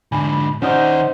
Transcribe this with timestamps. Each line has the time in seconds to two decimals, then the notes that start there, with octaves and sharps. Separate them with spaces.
0.12 G#2 D3 G#5 B5
0.62 D#3 C#4 D#4 C5 D5 F#5 D#6